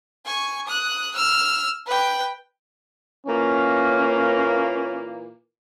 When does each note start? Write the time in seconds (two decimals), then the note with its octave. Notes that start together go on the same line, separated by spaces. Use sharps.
0.25 G#5 C#6
0.67 D#6 F#6
1.15 E6 F6
1.86 B4 G5
3.26 A#2 E3 A#3 C#4